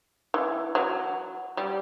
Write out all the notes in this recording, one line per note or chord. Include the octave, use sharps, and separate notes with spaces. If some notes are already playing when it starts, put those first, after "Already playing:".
E3
F#3
G3